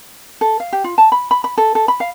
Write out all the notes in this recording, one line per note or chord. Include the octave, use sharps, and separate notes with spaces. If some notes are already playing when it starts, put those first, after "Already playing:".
A4
F5
G4
F4
A5
B5
B5
B5
A4
A4
B5
F5